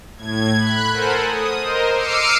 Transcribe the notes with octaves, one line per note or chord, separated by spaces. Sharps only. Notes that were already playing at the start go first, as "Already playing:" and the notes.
A2 G#6
B5 F#6
A4 A#4 C5 F#5 G#5
D#6
A#4 C5 D#5
D6 E6 F6 C7 C#7 D#7